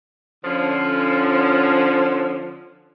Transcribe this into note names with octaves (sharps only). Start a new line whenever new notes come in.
D3 F3 C#4